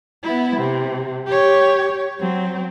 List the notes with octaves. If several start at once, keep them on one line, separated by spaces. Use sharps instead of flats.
B3 E4
C3
G4 C#5
F#3 C4